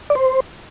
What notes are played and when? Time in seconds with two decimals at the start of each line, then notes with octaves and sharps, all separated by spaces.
0.10 D5
0.15 C5